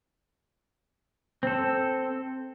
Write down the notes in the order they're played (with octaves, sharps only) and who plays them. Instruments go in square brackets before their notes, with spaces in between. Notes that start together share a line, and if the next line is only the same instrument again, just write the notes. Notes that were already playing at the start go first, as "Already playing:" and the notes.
[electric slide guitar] C4 A4